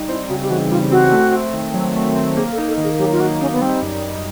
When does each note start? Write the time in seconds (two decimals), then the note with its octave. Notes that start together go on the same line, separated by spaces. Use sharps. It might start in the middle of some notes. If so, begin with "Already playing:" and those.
Already playing: G3 D#4
0.08 C4 E4
0.29 C#3 F#4
0.42 G4
0.50 E3 F#4
0.71 G3 F4
0.91 C4 F#4
1.12 A3
1.32 C4
1.53 D#3
1.74 F#3
1.96 A3
2.15 C4
2.37 A#3 G#4
2.52 A4
2.58 D#4
2.68 A4
2.78 D#3
2.84 G#4
2.99 F#3 G4
3.11 F4
3.19 A#3 F#4
3.41 C#4 D#4
3.52 B3
3.61 G3 C4
3.82 F#2
4.03 F#2